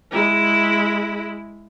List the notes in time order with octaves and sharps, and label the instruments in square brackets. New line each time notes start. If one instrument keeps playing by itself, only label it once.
[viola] G#3 E4